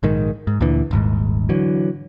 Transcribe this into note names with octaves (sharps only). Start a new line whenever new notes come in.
A#1 G#2 D#3
G#2
D2 A#2 D3 E3
D#1 G#1 G#2
D3 E3 F#3